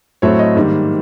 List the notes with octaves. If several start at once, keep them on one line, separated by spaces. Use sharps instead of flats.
A2 F#3 A3 C4 C#5
D#5
G#2 D#3 G3 A#3